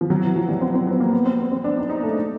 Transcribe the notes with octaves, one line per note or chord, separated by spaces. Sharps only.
F3
F#3
E3
F3
G3
C4
C4
B3
A#3
B3
C4
B3
C4
D4
D#4
D#4
A3